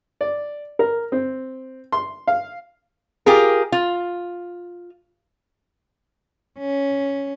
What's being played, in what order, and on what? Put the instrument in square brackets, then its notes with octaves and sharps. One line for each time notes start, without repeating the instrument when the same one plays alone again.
[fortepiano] D5
A#4
C4
C6
F5
[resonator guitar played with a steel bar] F4 G4 G#4 A#4
F4
[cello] C#4